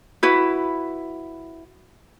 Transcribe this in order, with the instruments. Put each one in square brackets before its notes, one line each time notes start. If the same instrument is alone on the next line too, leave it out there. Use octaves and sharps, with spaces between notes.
[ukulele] E4 F#4 B4